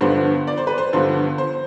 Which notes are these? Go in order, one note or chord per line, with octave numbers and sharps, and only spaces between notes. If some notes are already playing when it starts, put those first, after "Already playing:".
G2 D3 F3 B3 D4 C5
D5
C5
B4
C5
G2 D3 F3 B3 D4 C5
C5